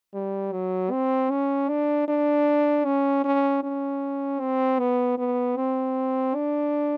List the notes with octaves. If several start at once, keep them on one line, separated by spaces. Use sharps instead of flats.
G3
F#3
C4
C#4
D4
D4
C#4
C#4
C#4
C4
B3
B3
C4
D4